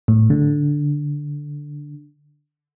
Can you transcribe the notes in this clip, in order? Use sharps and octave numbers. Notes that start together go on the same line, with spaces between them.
A2
D3